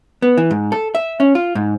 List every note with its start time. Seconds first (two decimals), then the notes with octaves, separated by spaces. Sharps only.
0.22 B3
0.38 E3
0.51 G#2
0.72 A4
0.95 E5
1.20 C#4
1.35 F4
1.55 G#2